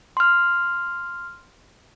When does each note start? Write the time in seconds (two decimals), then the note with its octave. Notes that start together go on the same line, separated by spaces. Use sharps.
0.17 C6 F6